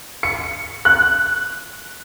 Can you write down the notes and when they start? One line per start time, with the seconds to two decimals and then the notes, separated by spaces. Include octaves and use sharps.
0.23 C#7
0.85 F#6